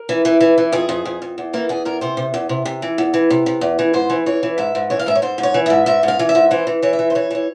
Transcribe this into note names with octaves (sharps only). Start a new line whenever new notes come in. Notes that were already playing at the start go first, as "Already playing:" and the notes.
Already playing: A#4
E3
E3
E3
E3
F2 G#4
F2
F2
F2
E2
E3 A#3
E2 G#4
E2 A#4
C3 C5
C3
E2
C3
C3
E3
E2
E3
C3
C3
E2
E3
G#2 C5
E3
E3 C#5
E3
G#2 E5
G#2
E3 C#5
F5
G#2 E5
C#5
G#2 C5
G#2
C#5
E3
G#2 E5
G#2 E5
G#2 F5
E3
E5
G#2
E3 C5
E3
E3 C#5
E5
E3
C5
E3 C#5
E3 C#5